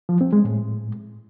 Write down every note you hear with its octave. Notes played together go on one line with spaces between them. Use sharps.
F3
C4
G#3
A2